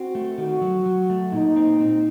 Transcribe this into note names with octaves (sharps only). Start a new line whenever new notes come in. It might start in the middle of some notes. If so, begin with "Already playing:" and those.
Already playing: C4 F#4
A3
D#3 F#4
F#3
F#3
A3
A#2 D#4
C4
C4